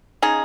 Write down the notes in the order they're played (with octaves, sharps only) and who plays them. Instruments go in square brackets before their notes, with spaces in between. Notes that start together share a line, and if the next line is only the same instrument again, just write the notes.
[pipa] C#3 D#4 G#4